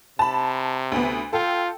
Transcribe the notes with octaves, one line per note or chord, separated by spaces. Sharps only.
C3 A5 B5
D2 B3
F4 A4 G5